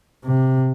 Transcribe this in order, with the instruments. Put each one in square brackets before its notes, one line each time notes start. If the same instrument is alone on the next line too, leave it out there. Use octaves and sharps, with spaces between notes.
[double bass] C3